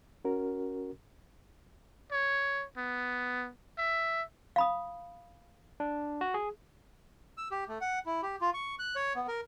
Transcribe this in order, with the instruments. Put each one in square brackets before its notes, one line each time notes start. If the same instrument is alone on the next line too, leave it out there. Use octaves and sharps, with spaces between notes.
[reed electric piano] C#4 F#4 A#4
[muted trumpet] C#5
B3
E5
[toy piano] F5 B5 D#6
[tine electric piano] D4
F#4
G#4
[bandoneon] E6
G4
A3
F#5
E4
G4
F4
C#6
F#6
C#5
B3
A#4